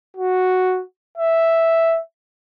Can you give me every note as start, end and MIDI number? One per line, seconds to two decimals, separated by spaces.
0.16 0.81 66
1.18 1.99 76